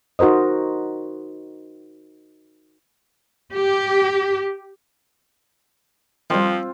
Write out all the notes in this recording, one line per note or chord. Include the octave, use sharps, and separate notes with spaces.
D#4 F#4 A#4 C5 D#5
G4
D#3 F3 G3 C4 F4